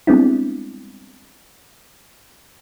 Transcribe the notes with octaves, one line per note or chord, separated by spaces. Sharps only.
G3 G#3 B3 C4 D4 E4